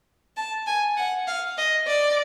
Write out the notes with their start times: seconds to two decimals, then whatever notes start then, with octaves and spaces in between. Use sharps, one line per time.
0.37 A5
0.67 G#5
0.97 F#5
1.28 F5
1.58 D#5
1.87 D5